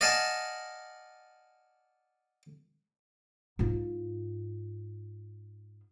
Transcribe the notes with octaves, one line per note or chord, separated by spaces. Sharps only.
D5 D#5 F5 F#5 G#5 A5
G#2 F4